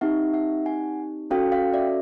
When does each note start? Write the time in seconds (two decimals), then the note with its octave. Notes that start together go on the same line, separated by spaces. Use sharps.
0.01 C4 D#4 G4 E5 F#5
0.33 E5 F#5
0.66 F#5 G#5
1.31 C#4 F#4 A4 F5 G5
1.52 F5 G5
1.74 D5 E5